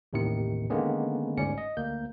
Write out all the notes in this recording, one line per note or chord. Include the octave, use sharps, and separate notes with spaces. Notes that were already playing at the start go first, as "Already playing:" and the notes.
A1 D#2 A2 C3 D#3 C#7
D3 D#3 G#3 A#3 B3 C#4
G1 D2 G#2 C#4 D5 C#7
D#5
D2 A#3 G6